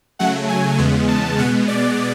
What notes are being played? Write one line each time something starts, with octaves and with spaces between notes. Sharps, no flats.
C#3 F#3 A3 F#5
G#5
E2 C#3 G#3 B3
A5
B2 G#3 B3 F#5
D5